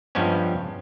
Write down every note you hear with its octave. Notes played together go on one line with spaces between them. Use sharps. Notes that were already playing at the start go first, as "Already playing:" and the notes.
G2 F3 G3 G#3 B3 C#4